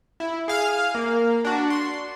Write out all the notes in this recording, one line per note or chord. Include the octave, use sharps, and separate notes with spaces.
E4
G#4 F5 F6
A#3
D4 F#4
C6